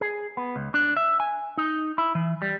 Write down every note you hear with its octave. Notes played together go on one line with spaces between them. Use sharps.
G#4
B3
C#2
D4
E5
G#5
D#4
E4
E3
G3